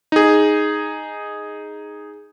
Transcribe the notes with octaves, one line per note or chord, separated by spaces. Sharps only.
D#4 G#4